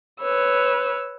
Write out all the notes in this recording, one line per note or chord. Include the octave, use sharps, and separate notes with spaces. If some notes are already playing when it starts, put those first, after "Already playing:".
B4 C#5 E6